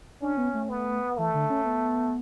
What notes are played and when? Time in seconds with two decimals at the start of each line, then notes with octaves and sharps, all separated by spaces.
0.22 C#4 D4
0.37 B3
0.54 A3
0.69 B3
1.17 E3 A3
1.34 D3
1.50 C#4
1.65 B3